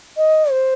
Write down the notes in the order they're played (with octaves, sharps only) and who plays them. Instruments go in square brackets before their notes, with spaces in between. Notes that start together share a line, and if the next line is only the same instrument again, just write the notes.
[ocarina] D#5
C5